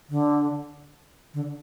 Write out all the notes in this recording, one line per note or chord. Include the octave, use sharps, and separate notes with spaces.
D3
D3